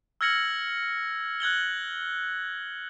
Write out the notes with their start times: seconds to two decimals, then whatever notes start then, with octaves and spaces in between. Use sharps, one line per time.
0.21 E6 F6 G#6 A#6 C#7 F#7
1.40 F#6 G#6 F#7 G7